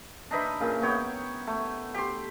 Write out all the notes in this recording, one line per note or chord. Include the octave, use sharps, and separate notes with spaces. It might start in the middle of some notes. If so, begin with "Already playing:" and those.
D4 D#4 B4 E5
A#2 C#3
B3 C#5 G5
A3
G4 C6